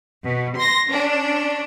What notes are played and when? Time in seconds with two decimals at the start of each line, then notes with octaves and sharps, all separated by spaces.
0.24 B2
0.57 C6 A#6
0.89 C#4 D4